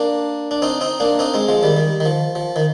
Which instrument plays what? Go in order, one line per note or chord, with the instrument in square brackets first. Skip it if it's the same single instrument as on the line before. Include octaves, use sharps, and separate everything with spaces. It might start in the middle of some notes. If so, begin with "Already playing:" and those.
Already playing: [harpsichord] A#3 D4
D4
C4 D#4
C4 D#4
A#3 D4
C4 D#4
G#3 C4
F3 G#3
D#3 G3
D#3
D#3
F3
F3
D#3